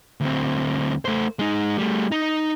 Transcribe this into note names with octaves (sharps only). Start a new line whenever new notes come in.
D2 C4
A3 C5
G#3 D#4
G3 A3
D#4